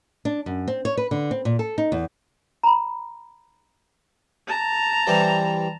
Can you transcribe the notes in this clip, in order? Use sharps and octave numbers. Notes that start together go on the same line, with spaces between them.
D4
F#2
C4
C#5
B4
D3
C4
A#2
A4
D#4
E2
A#5 B5
A5 A#5
E3 G3 C4